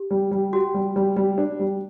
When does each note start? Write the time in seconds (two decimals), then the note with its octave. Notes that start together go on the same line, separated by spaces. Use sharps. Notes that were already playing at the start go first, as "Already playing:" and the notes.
Already playing: G4
0.11 G3
0.31 G3
0.53 F#4 G4
0.74 G3
0.96 G3
1.16 G3
1.38 D4
1.59 G3